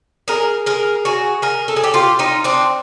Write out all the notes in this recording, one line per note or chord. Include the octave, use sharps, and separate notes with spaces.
G#4 A#4
G#4 A#4
F#4 G#4
G#4 A#4
A4
G#4
G4 A4
F4 G4
D#4 F4
C4 D4